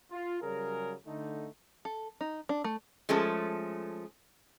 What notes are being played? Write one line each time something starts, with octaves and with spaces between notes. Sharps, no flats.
F4
C#3 F#3 G3 G#4 A#4
D3 A3 D#4
A4
D#4
D4
A3
F3 G#3 A3 C#4 A4